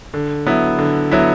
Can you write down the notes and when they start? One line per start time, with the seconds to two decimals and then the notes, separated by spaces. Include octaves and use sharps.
0.14 D3
0.47 F#3 B3 E4
0.79 D3
1.11 F#3 B3 E4